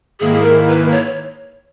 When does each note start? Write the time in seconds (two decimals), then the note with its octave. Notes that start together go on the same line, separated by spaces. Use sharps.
0.20 G#2 D#3 A#3 E4 G#4
0.34 G#4
0.44 A#4
0.68 B4
0.92 C#5